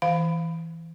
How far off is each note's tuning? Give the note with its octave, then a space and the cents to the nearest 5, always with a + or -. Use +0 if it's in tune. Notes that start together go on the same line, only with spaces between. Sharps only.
E3 -5 F5 +0